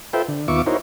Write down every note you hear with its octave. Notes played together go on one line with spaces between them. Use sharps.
F4 A4 B4 C5 E5 G5
D3
D#2 B3 F4 E5 C#6 D6
D#4 E4 F#4 A#4 C5 C#5